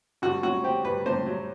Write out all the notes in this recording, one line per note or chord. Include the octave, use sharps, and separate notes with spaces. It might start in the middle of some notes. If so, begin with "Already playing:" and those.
G2 F#4
F#3 F#4
C4 G4
G2 B4
G2 C5
F#3